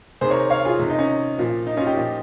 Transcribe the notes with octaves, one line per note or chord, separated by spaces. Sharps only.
C3 D#3 G#4 C5
A#4 C#5
C#5 F5
F4 G#4
C3 D#3
D#4
C#4
A#2 F3
D#4
C#4 F4
D#4 G4
A#2 F3